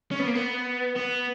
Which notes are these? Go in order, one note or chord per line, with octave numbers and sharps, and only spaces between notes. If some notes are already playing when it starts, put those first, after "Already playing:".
C#4
B3
A#3
B3
B3